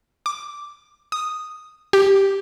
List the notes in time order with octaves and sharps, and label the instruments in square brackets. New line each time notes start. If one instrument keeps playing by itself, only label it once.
[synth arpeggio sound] D6
D#6
G4